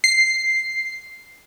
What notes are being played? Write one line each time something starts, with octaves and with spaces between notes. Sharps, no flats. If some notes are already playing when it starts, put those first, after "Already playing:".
C7